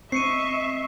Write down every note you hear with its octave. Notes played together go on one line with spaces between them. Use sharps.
C4 D#5 E5 C#6 C7 C#7 D#7